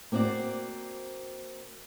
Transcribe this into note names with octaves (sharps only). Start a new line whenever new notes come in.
A#3 C4 F#4 C5 D5